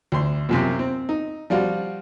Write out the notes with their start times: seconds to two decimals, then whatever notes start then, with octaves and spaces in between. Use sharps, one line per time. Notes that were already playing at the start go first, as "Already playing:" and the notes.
0.12 D2 C6
0.49 A#1 F#2 C3
0.79 C4
1.09 D#4
1.50 F3 G3 F4 F#4